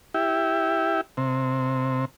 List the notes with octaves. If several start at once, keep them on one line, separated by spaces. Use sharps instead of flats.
E4 G4
C3